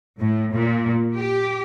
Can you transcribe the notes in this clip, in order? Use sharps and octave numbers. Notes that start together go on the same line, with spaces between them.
A2
A#2
G4